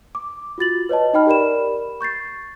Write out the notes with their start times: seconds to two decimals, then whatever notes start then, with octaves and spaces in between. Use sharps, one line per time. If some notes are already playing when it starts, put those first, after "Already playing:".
0.15 D6
0.58 F4 F#4 A6 F#7
0.89 B4 C#5 D#5 A5
1.14 D#4 D#5 G5 B5 F6
1.27 G4 A#4 D5 B5 E7
2.01 C#6 G6 A6 C7